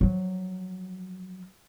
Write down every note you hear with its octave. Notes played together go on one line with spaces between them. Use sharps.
F3 F#3